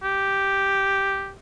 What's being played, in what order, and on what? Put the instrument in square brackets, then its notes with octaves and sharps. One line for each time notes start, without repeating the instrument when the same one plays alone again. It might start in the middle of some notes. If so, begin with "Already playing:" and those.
[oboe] G4